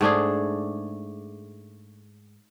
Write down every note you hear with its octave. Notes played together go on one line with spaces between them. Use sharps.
G#2 A3 D4 G#4